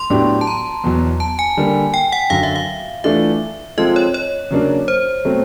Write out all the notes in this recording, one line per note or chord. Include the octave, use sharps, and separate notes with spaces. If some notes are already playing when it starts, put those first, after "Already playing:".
Already playing: C6
A2 F#3 B3 D4 G4
A5
A#5
E2 B2 F#3
A5
G#5
D3 G3 A#3
G5
F#5
F#2 D3 F#3 F5
E5
F5
E3 A3 D4 F4 E5
F3 G#3 C4 F4 A4 D#5
C#5
C#5
C#3 F#3 A#3 D4
C5
B2 F#3 A3 C4